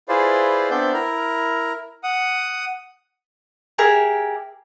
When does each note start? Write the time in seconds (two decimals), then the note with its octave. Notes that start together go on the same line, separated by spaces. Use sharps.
0.09 E4 F4 G#4 B4 C5 D5
0.70 B3 C4 D4 D5 E5 G6
0.93 E4 A#4
2.03 F#5 D#6
3.78 G4 G#4 A#4 E5